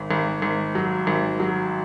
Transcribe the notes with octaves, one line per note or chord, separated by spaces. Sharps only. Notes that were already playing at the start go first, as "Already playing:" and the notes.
Already playing: G#1
G#1
G#1
F#3
G#1
F#3